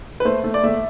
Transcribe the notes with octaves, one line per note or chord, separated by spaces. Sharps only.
B4
A3 C5
A3
D5
A3 E5